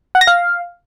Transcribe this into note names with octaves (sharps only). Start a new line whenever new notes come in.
F#5
A#6
F5